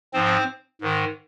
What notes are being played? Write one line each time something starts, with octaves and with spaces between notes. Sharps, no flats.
G#2 F3 C4 C5
G#2 D#3